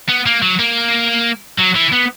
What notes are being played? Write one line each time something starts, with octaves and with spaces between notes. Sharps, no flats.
B3
A#3
F#3
A#3
F#3
E3
B3